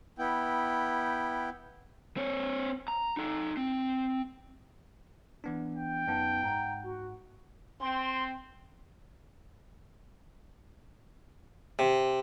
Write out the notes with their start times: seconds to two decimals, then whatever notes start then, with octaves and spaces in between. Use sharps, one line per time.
0.19 B3 E4 G5
2.17 C4 C#5
2.88 A#5
3.17 D#4 A4
3.57 C4
5.44 E3 B3 D4
5.75 G5
6.07 F#2 B3 D#4 A5
6.44 G#2 F#5 A#5
6.83 F#4
7.80 C4 C6
11.79 C3